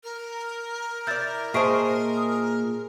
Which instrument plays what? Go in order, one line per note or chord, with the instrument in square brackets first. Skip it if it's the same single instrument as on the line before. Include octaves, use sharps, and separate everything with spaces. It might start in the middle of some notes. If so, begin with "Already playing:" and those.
[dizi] A#4
[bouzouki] E4 D5 [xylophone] G6 A6
[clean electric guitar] A#2 D#5 A5 [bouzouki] G#4 C5 [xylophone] E5 C#6 D7
[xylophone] D#6